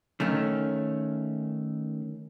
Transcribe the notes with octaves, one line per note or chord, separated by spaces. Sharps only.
D#3 A3 C#4